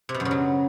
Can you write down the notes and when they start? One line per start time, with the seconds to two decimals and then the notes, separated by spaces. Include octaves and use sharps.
0.09 C3
0.14 B2
0.20 F#2
0.25 C#3
0.31 F#3